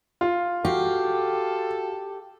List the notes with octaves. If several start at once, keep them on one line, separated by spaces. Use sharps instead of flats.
F4
F#4 G4 A4 F5